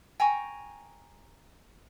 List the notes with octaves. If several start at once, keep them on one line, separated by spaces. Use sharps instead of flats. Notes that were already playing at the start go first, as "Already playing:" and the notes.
G5 G#5 A#5 C#6